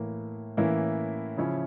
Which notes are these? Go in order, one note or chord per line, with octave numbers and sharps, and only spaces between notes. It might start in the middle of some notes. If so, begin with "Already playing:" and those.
Already playing: A2 E3 A#3 E4
A2 E3 A#3 C#4 E4
C#3 F3 C#4 E4